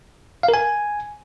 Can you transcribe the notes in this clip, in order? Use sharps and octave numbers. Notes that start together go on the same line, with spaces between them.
F5
A#4
G#5